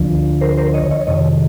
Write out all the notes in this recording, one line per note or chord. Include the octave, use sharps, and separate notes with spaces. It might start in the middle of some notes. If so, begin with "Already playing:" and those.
Already playing: D2 D3 F3
A#4 C5
A#4 C5
C#5 D#5
C#5 D#5
F2 C3 D#3 C#5 D#5